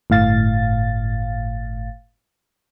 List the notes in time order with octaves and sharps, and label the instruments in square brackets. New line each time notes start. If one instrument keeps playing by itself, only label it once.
[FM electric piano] G1 A2 F5 A6